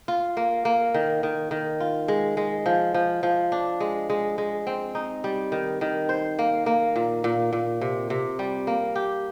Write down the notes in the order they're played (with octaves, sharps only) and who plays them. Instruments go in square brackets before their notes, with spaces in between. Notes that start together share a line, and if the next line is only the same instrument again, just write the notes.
[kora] F4
A#3
A#3
D#3
D#3
D#3
F4
G#3
G#3
F3
F3
F3
D4
G#3
G#3
G#3
C4
D#4
G3
D#3
D#3
C5
A#3
A#3
A#2
A#2
A#2
C3
C3
G3
A#3
G4